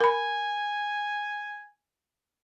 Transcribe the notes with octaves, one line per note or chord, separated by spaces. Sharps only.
A#4 G#5 B5